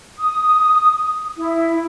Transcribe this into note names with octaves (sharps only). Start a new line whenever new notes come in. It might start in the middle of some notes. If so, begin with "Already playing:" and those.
D#6
E4